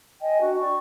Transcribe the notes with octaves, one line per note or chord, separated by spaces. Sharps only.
D#5 G5 G#5
D4 F#4
D5 G5 C#6